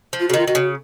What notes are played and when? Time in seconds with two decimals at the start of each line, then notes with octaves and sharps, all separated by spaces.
0.13 F3
0.20 F4
0.28 C#3 F#4
0.34 D#3 F4
0.47 D#3 F#4
0.55 C#3